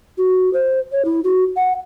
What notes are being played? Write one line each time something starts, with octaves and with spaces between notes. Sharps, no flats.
F#4
C5
C#5
E4
F#4
F#5